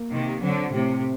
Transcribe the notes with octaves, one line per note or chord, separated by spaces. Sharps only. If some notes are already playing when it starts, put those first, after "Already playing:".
Already playing: A#3
C3 D#3
D3 F#3 C4
A2 C3